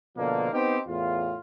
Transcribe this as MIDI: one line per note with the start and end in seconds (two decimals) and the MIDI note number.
0.17 0.50 47
0.17 0.50 50
0.17 0.50 53
0.17 0.50 58
0.53 0.79 59
0.53 0.79 60
0.53 0.79 63
0.53 0.79 67
0.53 0.79 72
0.87 1.37 40
0.87 1.37 45
0.87 1.37 65